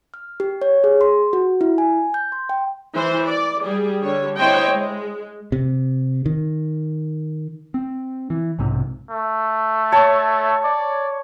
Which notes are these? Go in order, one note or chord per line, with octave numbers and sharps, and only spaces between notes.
F6
G4
C#5
G#4
C6
F#4
E4
G#5
G6
C6
G5
E3 C5
D5
G3 G#4
D3 G3 C#5
C4 E4 C5 C#5 D#5 G5
G#3
C3
D#3
C4
E3
B1 G#2 C3
A3
C#5 A5
D5